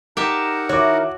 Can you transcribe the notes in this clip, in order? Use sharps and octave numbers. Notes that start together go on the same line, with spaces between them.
D#4 G4 A#4 E5 F#5 A5
D#3 E4 F#4 C#5 D6